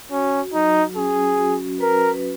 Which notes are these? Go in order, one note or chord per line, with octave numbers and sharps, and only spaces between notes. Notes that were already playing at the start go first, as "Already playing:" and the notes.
C#4 F#4
F#3 D#4
C#4 G#4
F#4
A#4 B4